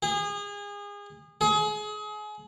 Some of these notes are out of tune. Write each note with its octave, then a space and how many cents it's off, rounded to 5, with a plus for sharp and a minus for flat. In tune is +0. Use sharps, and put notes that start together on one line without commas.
G#4 -30
G#4 +30